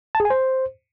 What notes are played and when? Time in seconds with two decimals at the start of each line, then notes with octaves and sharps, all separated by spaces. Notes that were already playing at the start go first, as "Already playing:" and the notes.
0.15 A5
0.20 G#4
0.25 G#5
0.30 C5